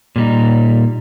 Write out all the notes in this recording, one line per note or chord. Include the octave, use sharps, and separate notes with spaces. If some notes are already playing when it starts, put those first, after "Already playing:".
A#2 G3 D#4